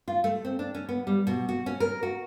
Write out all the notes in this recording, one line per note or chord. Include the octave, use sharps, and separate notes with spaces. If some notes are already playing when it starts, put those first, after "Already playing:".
F4
A3
C4
D4
C#4
B3
G3
B2
F#4
C#4
A#4
F#4